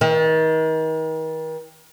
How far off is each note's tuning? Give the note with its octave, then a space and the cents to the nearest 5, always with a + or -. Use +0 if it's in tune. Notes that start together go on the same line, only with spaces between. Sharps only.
D#3 +40